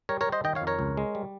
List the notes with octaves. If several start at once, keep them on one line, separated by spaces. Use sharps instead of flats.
G3 A#4 C#5
A#4 C#5
G3
C5 D#5
D#3 D#5 G5
C#5 F5
F2
A#4 C#5
C#2
G#3
G3